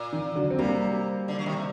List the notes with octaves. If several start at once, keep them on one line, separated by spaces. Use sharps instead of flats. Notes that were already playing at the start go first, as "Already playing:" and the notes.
Already playing: A#2
D#3
D3 F#3
C4
C3 G3 A#3
D3
F#3
C3 D#3
C3